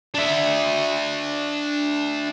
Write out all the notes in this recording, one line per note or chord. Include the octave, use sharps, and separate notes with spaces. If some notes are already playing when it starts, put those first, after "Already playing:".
D4 E5